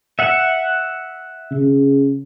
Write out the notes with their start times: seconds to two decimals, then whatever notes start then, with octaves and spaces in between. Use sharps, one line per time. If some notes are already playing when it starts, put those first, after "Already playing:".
0.19 E5 F#5
1.51 C#3